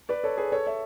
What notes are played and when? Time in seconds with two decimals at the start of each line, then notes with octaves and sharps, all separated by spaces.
0.09 B4 D5
0.24 A4 C#5
0.37 G#4 B4
0.52 A4 C#5
0.67 C#5 E5